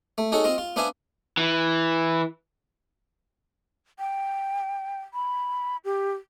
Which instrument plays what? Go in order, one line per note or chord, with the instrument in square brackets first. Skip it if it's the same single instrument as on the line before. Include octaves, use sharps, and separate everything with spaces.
[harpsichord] A3
D#4 F#4 G#4 A4 C#5
C4 F4 D#5 F5
F4
B3 D4 C5 E5 F5 G#5
[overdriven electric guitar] E3
[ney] G5
B5
G4